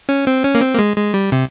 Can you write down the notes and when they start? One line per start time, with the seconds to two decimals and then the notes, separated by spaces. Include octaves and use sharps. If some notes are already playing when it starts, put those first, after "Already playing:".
0.09 C#4
0.27 C4
0.44 C#4
0.55 A#3
0.61 C4
0.74 A#3
0.79 G#3
0.97 G#3
1.14 G3
1.32 C3